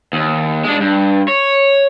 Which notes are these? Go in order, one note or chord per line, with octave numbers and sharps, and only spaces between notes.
D#2
G#3 D4
G2
C#5